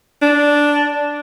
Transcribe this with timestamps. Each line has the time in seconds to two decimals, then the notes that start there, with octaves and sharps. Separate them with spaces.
0.22 D4